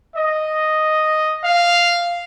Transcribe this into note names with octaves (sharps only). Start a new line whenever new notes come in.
D#5
F5